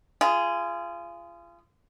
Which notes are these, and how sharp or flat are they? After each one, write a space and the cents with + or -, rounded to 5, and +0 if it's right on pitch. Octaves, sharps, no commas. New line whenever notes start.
F4 -30 G#4 +0